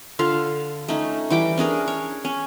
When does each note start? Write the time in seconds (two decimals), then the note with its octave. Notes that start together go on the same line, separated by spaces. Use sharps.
0.19 D3 F4 A4 F5
0.88 A3 C#4 D#4
1.30 E3 G3 G5 D6
1.57 C#4 D4 G#4 A#4
1.88 C#5
2.25 C#4